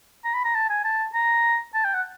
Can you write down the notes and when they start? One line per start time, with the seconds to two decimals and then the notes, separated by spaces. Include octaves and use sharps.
0.25 A#5
0.34 B5
0.45 A#5
0.55 A5
0.70 G#5
0.84 A5
1.14 A#5
1.74 A5
1.85 G5
1.94 F#5